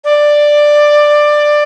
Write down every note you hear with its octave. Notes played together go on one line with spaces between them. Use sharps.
D5